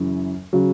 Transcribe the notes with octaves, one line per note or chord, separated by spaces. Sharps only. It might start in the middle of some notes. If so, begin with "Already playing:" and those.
Already playing: F#2 C#3 E3
C#3 F#3